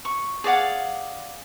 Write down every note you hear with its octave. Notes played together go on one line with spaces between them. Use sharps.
C#6
G#4 D5 F5 F#5